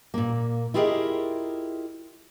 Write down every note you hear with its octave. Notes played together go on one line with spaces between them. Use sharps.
A#2 A#3
E4 F4 G4 G#4 A#4 D#5